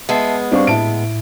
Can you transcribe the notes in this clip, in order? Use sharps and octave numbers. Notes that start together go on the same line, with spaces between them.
G#3 B3 E5 A5 C7
G3 C4 D4 F5 C#6
A2 E4 A5 D7